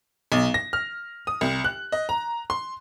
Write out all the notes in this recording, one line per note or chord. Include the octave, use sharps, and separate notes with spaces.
B1
A#6
F6
D#6
C2
F#6
D#5
A#5
C6